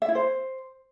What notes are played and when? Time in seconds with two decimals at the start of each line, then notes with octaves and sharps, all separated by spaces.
0.02 E5
0.08 E4
0.15 C5